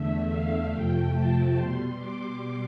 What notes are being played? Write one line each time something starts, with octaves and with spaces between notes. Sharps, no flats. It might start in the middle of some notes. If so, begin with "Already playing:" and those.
Already playing: E2 D3 A3 E5
F5
F2 C3 F3 A3 G5
A5
B2 G3 C6
D6